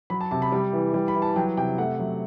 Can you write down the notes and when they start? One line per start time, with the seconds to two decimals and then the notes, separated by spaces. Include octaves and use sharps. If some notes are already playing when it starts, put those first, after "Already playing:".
0.10 F#3 B5
0.21 A5
0.31 C3 A5
0.42 B5
0.52 G3
0.73 E3
0.94 G3
1.08 B5
1.15 E3
1.22 A5
1.36 F#3 G5
1.57 C3 G5
1.78 A3 F#5
1.99 F#3